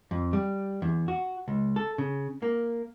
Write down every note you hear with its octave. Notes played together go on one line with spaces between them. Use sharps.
F2
G3
E2
F#4
C#2
A4
C#3
A#3